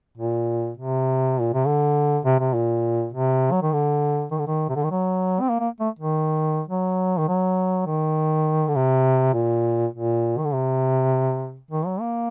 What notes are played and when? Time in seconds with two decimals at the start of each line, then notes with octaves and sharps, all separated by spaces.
0.18 A#2
0.77 C3
1.41 A#2
1.54 C3
1.65 D3
2.25 C3
2.40 C3
2.54 A#2
3.13 C3
3.52 F#3
3.62 D#3
3.72 D3
4.31 D#3
4.39 D3
4.47 D#3
4.69 C3
4.76 D3
4.83 D#3
4.91 F#3
5.41 C4
5.50 A#3
5.60 A#3
5.80 A3
5.99 D#3
6.68 F#3
7.18 D#3
7.28 F#3
7.86 D#3
8.68 D3
8.76 C3
9.34 A#2
9.93 A#2
10.38 D#3
10.45 D3
10.53 C3
11.71 D#3
11.86 F#3
12.01 A#3